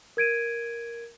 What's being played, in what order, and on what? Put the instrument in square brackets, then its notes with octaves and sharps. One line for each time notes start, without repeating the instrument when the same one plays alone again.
[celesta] A#4 G#6 D7 D#7